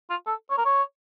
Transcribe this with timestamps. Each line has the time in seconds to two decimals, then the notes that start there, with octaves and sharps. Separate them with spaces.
0.10 F4
0.26 A4
0.50 C#5
0.58 A#4
0.65 C#5